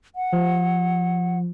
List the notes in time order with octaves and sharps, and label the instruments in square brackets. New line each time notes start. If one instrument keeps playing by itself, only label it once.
[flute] F#5
[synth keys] F3